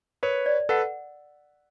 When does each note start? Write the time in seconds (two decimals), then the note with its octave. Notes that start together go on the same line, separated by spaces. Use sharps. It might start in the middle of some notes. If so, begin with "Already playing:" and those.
0.23 A#4 B4 C#5
0.46 D5
0.69 A4 B4 F#5